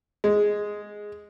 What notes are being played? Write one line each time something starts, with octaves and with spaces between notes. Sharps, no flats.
G#3